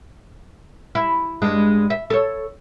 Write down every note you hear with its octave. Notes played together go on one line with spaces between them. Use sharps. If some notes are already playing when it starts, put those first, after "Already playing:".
E4
G2 G#3 D4
E5
A4 C#5